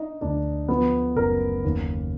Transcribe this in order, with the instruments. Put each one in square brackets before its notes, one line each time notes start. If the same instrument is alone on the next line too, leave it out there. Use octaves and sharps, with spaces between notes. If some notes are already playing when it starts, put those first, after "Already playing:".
Already playing: [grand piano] D4 D#4 D#5
D2 D4 D5
F3 B3 B4
F#1 A#4
D#2